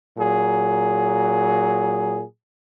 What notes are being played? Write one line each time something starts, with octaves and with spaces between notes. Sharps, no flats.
A#2 F#3 G#4